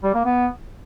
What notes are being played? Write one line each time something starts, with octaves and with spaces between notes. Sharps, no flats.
G3
A#3
B3